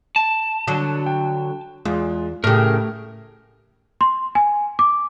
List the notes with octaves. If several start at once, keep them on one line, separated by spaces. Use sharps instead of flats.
A5
D3 F#3
G5
E2 G#3 F4
A2 C#3 A3 G4 A#4
C6
G#5
D6